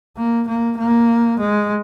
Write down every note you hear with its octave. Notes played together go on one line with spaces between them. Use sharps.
A#3
A#3
A#3
G#3